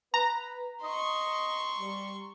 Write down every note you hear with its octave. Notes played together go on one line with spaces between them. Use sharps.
B4 A#5
D#5 C6 C#6
G3